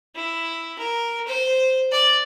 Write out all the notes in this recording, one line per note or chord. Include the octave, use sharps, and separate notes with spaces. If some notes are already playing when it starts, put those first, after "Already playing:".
E4
A#4
C5
D5